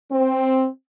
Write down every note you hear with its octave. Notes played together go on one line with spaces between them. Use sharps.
C4